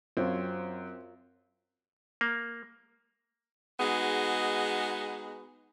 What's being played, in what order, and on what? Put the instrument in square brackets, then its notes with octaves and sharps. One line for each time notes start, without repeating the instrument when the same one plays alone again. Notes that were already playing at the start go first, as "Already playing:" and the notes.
[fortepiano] F#2 [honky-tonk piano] C4 [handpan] F4 C#5
[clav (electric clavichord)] A#3
[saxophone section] G#3 B3 D#4 F#4 G#4